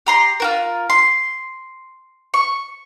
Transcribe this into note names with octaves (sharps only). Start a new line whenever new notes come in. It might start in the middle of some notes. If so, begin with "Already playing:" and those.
G4 A#5 C6
F4 F#4 A#4
C6
C#6